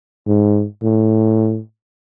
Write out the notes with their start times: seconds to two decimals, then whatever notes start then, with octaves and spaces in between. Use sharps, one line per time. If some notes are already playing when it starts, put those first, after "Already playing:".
0.27 G#2
0.82 A2